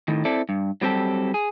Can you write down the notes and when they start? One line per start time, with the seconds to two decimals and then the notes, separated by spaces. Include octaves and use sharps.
0.08 A2 D#3
0.25 C4 E4 A4 D5
0.49 G2
0.82 F#3 G3 C4 G4 A4
1.34 G#4